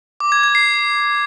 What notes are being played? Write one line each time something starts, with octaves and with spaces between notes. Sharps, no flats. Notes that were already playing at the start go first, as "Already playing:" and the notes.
D6
G#6
G#6
C7